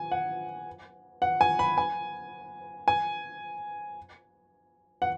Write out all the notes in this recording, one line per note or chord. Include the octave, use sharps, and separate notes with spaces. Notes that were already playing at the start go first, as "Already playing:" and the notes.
Already playing: G#5
F#5
F#5
G#5
B5
G#5
G#5
F#5